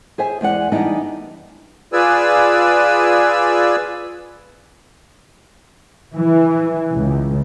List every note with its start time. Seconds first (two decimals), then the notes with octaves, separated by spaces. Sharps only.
0.18 G#4 C5 E5 G#5
0.41 E2 G#3 D5 F#5
0.72 E3 G3 G#3 B3 D4 D#4
1.93 F4 G#4 B4 D5 G#5 E6
6.14 E3
6.94 C#2